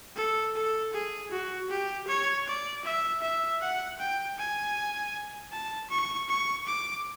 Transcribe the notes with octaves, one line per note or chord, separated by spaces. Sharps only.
A4
A4
G#4
F#4
G4
C#5
D5
E5
E5
F#5
G5
G#5
A5
C#6
C#6
D6